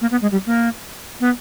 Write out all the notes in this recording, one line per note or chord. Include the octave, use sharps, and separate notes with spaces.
A#3
B3
G#3
G3
A#3
B3